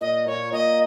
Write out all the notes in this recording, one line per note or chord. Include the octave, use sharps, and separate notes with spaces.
A#2 D#5
A#2 C#5
A#2 D#5